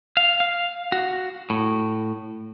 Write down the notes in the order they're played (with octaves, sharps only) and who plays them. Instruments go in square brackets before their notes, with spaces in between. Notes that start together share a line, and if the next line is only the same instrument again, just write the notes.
[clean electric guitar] F5
F5
F#4
A2